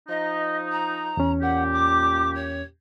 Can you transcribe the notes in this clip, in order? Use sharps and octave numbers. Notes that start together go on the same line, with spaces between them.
F3 D#4 D#5
A#5
E2 C#4
A#2 G4 F#5
D6
C#5